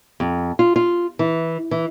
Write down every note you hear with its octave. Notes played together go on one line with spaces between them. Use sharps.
F2
F4
F4
E3
E3